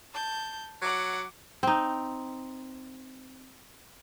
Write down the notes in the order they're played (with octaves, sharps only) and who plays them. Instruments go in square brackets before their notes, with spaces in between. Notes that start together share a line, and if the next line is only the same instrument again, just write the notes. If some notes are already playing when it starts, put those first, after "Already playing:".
[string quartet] A5 G6
[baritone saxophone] F#3 [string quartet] F#5 D6
[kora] C4 D#4